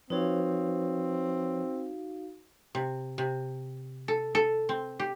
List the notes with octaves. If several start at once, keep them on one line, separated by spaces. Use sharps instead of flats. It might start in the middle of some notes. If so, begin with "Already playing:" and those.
F3 C4 D#4 F#4 B4 C#5 F5
C3
C3
A4
A4
C4
G4